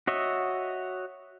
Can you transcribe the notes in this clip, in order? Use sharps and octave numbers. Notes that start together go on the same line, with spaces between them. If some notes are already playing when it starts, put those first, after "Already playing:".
F#4 C#5 D#5 E5